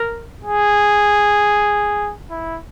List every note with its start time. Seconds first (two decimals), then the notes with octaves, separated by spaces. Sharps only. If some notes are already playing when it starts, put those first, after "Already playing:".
Already playing: A#4
0.44 G#4
2.30 E4